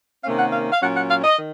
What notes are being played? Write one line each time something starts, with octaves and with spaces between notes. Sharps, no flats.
C3 D#3 A#3 C#4 F5
F#5
F5
F5
A#2 F#3 C#4 F#5
F#5
F5
D#5
D#3